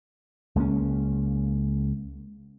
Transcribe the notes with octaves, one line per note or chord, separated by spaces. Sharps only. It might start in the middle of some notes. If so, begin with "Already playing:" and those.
C#2 G#3 A#3 C#4